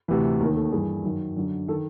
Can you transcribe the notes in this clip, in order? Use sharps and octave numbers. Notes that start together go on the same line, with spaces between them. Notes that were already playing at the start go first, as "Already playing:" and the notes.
D2 C3 E3 B4
D#2 D#3 A#4
A4
G2 E3 G#4
F#2 D#3
F#2 D3
D#3 A4